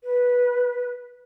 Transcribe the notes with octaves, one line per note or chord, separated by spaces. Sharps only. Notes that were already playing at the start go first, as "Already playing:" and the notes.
B4